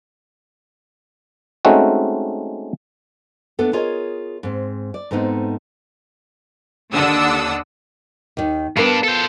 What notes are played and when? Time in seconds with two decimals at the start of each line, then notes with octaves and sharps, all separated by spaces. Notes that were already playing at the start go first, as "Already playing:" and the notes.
1.65 G#3 A3 C4 C#4 D#4 F#4
3.59 A3 B3 D4 A4
3.73 F4 G#4 A#4 C#5 D#5
4.43 G#2 C4
4.94 D5
5.11 G#2 A3 B3 C4 D#4
6.93 D#2 D3 D4 F#5 D#6 E6
8.37 D#2 D#3
8.77 G2 B3 D4 A#4 F5
9.04 A4 C5